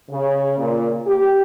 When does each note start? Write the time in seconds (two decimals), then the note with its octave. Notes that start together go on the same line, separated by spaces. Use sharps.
0.11 C#3
0.58 A#2
1.07 G4